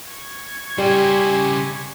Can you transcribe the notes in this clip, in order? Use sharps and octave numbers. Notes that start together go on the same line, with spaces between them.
C#6 G#6
C#3 G3 E4 G4 G#5 C6